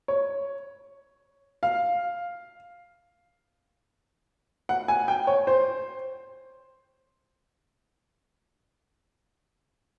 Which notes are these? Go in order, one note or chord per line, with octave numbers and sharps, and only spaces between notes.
C#5
F5
F#5
G#5
G5
C#5
C5